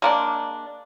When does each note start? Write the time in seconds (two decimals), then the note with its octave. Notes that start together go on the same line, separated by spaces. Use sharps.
0.02 G#3 A#3 D4